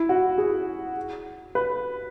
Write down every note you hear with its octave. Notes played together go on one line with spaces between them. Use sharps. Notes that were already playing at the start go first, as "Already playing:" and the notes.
Already playing: E4
F#4
G#4
B4